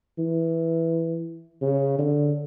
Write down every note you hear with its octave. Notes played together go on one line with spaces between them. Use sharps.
E3
C#3
D3